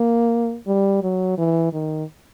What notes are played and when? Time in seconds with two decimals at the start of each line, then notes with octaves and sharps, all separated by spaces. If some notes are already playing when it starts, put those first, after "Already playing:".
Already playing: A#3
0.67 G3
1.03 F#3
1.38 E3
1.73 D#3